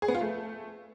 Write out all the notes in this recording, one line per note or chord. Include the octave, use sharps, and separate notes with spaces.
G#4
B3
F4
A3